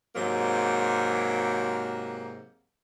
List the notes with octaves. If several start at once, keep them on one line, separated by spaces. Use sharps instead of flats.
G#2 C3 F#3 A#3